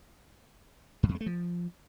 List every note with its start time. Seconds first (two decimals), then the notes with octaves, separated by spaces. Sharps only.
1.03 G2
1.09 F2
1.15 G#3
1.21 A3
1.26 F3